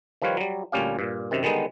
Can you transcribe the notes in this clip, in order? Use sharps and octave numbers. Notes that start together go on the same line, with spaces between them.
D#3 F3 G3 F4 B4 C#5
F#3 G3
D2 A#2 G3 C#4 G4 F5
G2 A#2
F#2 C3 D#3
D3 D#3 G3 G#3 B3 D#4